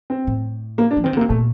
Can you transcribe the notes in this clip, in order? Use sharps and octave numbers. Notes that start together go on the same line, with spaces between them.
C4
A2
A#3
D4
F3
D#3 C4
D3
A#3
C3
A#2 A3